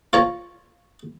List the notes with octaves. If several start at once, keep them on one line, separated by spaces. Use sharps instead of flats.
F4 C#5 A#5